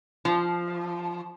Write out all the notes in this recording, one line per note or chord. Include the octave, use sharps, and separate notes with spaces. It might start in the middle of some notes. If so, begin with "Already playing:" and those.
F3